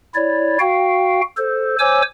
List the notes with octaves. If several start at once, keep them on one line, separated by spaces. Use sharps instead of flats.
E4 C#5 D5
F#4 F5 G5
A4 C5
C5 C#5 G#5 D6 E6